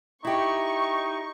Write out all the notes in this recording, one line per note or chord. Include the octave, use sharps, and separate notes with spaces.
D#4 E4 G4 C#6